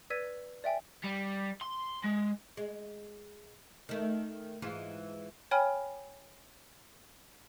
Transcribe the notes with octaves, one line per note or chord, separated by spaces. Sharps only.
B4 D5 E6 G#6 B6 D#7
D5 E5 G5 G#5
G3
C6
G#3
G#3
D#3 A3
G#2 E3 F4
C#5 G5 G#5 B5 F6